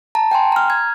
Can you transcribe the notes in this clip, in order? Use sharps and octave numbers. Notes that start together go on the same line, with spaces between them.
A5 A#5
G5 G#5 C6
A#5 F6
G#6